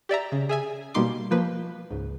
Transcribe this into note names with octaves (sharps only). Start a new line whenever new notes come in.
G4 D5 E5 A#5
C#3
G#4 E5 G#5
B2 G3 A#3 D#4 C6 D6
F3 A#3 B4
C#2 G#2